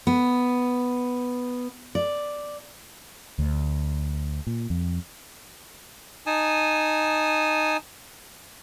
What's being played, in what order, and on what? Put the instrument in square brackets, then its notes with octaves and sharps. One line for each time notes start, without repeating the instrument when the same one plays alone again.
[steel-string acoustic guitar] B3
D5
[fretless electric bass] D2
A#2
F2
[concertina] D#4 G#5 A5 D#6